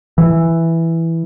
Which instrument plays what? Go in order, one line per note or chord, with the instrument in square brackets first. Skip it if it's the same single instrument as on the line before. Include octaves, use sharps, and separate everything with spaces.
[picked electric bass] E3